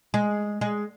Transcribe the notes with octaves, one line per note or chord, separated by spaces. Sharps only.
G#3
G#3